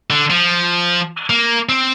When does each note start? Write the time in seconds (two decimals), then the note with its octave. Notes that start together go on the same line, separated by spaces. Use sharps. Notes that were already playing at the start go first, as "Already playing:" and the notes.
0.11 D3
0.31 F3
1.30 A#3
1.69 C4